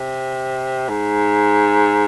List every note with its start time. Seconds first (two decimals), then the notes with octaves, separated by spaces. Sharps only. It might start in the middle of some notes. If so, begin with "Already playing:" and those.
Already playing: C3
0.89 G#2